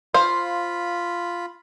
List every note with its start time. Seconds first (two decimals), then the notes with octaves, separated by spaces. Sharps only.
0.14 F4 C5 F5 B5